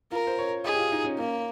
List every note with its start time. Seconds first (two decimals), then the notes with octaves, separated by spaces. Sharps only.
0.12 F4 A#4
0.27 C5
0.39 C#5
0.65 G#4 D#5
0.73 G4
0.79 F4
0.92 D#4
1.05 C#4
1.18 A#3 C#4